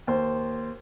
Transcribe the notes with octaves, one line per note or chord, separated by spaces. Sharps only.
D#2 C5